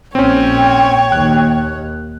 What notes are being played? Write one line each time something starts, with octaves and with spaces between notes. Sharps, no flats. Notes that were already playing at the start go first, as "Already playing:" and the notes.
A#1 C4 C#4 C#5 G5
D#2 F#6